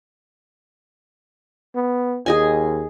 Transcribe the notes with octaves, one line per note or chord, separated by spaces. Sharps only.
B3
D#2 G#4 D#5 G#5